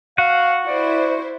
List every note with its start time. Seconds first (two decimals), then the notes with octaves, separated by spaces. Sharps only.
0.18 F#4 F5 F#5
0.66 E4 C5 D5